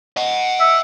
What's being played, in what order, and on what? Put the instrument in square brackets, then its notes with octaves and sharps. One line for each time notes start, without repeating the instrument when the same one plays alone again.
[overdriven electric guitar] D#5 F#5
[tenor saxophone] E5